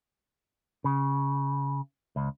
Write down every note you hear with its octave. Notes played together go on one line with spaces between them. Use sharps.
C#3
C#2